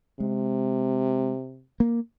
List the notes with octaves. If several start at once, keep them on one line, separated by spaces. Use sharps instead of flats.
C3 G#3
A#3